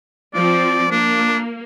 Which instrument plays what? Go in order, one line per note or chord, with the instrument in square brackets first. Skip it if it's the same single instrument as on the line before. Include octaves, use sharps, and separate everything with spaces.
[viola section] F3 C4 [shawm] D5
[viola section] A#3 [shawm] D4